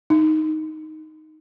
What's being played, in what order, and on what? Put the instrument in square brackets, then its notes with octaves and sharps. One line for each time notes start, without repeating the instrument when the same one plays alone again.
[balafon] D#4